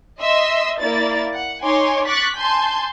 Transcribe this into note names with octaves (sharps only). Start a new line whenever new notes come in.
D#5 E5 C6 E6
A#3 E4 D5 A6
F#5
D#4 C#5 G#5 C6 D6
C#6 D6 F#6 A6 B6
G#5 A5 C6 G6